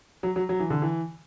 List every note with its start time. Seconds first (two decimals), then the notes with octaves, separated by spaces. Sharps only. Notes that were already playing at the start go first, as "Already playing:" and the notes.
0.23 F#3
0.36 F#3
0.49 F#3
0.60 E3
0.70 D3
0.82 E3